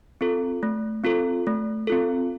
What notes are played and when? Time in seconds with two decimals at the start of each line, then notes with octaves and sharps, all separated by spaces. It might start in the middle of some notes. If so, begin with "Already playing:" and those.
0.21 C4 F4 A4
0.63 A3
1.04 C4 F4 A4
1.47 A3
1.87 C4 F4 A4